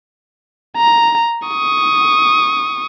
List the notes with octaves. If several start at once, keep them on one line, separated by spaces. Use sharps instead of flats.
A#5
C#6 D#6